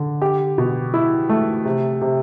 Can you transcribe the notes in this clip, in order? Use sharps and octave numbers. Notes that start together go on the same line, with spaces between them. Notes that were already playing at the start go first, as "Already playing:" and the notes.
Already playing: D3
G4
B2
E4
A3
C3
C3